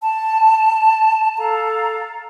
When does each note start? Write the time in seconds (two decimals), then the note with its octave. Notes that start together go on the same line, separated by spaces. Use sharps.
0.01 A5
1.37 A4 F5 A#5